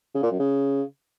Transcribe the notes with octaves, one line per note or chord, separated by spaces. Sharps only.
C#3
A#2
F#2
C#3